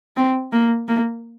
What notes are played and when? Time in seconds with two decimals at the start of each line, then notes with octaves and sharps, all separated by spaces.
0.17 C4
0.53 A#3
0.88 A#3